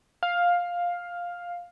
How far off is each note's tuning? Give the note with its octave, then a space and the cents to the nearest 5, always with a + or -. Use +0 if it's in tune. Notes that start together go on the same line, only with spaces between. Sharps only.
F5 +10